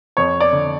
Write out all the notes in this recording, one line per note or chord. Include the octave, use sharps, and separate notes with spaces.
F2 C#5
D5
D3